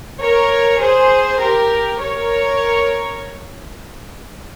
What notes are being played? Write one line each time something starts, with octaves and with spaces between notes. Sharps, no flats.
A#4 C#5
G#4 C5
G4 A#4
A#4 C#5